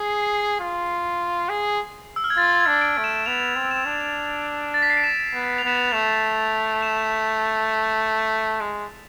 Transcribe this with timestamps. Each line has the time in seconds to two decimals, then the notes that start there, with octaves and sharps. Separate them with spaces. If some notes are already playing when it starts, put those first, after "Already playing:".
Already playing: G#4 C7
0.60 F4
1.49 G#4
2.16 E6
2.24 F6
2.30 G#6
2.37 F4 A6
2.60 G#6
2.67 D4
2.82 D7
2.98 A3
3.04 E7
3.16 E7
3.26 B3 F7
3.56 C4
3.71 E7
3.85 D4
4.74 A6
4.82 B6
4.90 C7
4.97 D7
5.04 E7
5.33 B3
5.58 F7
5.64 B3 E7
5.77 F7
5.93 A3 E7
6.82 E7
8.61 G#3